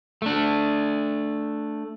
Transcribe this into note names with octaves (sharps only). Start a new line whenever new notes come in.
A3 D4